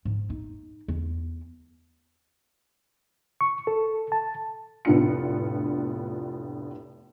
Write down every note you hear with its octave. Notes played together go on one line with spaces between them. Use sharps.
G#2
D#4
E2
C#6
A4
A5
F1 A2 B3 D4 F4 C#7